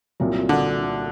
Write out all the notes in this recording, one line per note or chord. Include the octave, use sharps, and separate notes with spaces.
C2 A#2 F#3
D3